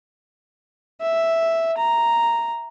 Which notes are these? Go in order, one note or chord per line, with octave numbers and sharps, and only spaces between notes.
E5
A#5